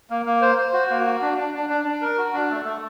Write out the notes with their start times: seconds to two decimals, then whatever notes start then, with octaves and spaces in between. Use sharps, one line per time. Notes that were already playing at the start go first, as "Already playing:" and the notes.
0.10 A#3
0.26 A#3
0.41 C5
0.58 C5
0.73 F#4
0.90 A#3
1.06 F#4
1.21 D4
1.38 D4
1.54 D4
1.70 D4
1.85 D4
2.01 A#4
2.18 F#4
2.33 D4
2.50 A3
2.65 A3